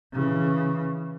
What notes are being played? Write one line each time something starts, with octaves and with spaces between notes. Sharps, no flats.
C#3 E3